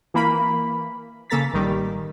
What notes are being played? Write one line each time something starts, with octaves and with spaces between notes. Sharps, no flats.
E3 A#3 B5
C#3 A#3 A4 A#5 A6 B6
A1 D#3 G3